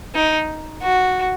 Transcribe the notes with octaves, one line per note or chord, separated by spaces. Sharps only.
D#4
F#4